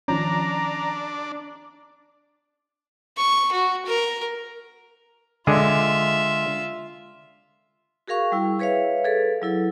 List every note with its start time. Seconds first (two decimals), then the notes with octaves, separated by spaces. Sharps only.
0.08 D#3 F3 C#4 D4 A#5
3.17 C#6
3.52 F#4
3.85 A#4
5.47 D3 G#3 F4 G#4 E5
8.08 F#4 G#4 A#4 F5 C#6
8.32 G3 E4
8.59 G#4 B4 C#5 E5 F5
9.05 G#4 A4 B4
9.42 F#3 E4 A4